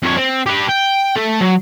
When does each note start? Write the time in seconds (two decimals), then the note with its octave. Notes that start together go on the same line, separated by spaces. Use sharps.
0.02 F2 C#5
0.17 C4
0.46 G4 B4
0.69 G5
1.16 A3 A4
1.40 F#3